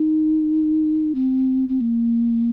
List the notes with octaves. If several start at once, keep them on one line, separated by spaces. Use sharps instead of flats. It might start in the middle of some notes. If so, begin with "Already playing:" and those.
Already playing: D#4
C4
C4
A#3